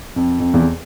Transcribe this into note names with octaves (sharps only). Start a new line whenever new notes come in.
F2
F2
E2